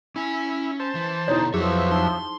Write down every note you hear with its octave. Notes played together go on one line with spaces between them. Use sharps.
C#4 E4 G#5
C5 A5
E3
B2 D3 D#4 E4 C#5
F2 F3 F#3 G#4 B4 C#5 E5
D#4 C6